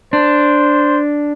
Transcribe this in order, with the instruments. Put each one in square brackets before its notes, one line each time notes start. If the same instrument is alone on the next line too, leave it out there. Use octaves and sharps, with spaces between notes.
[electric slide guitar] D4 [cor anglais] C5